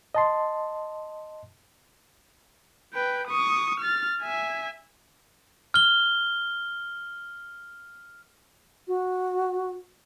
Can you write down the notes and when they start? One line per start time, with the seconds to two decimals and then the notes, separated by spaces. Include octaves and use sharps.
0.15 D#5 A5 C6
2.93 B4 G5
3.27 C#6 D#6
3.80 F6 A6
4.23 E5 G#5
5.74 F6 G7
8.88 F#4